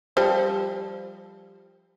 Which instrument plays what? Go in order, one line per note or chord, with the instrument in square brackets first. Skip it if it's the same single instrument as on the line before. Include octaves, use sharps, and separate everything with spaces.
[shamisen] F3 G3 C5